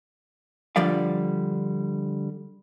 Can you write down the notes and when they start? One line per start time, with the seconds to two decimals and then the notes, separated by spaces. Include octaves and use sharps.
0.76 D3 F3 G3 D5 F5